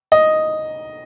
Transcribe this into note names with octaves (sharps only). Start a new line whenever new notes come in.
D#5